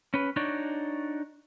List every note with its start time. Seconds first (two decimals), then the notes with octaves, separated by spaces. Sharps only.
0.14 C#4 B4
0.36 D4 D#4 F#4 C#5 D5